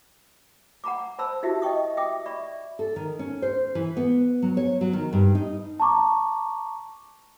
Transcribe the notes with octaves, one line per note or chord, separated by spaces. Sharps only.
F#5 A#5 B5 D6
C5 A5 B5 C6 E6
D#4 E4 F#4 G4 E5
D#5 E5 G5 C#6 D#6
E5 G5 D6 D#6
D5 E5 B5 C#6
A4
D#3
C#4
C5
E3
B3
F#3
C#5
F#3
D#3
G2
D#4
A5 A#5 C#6 D6